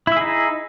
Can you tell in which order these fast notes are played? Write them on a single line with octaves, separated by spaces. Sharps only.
E4 E5 G#4 D#4